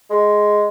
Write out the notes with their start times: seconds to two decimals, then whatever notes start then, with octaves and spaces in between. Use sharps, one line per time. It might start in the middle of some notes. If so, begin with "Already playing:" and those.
0.10 G#3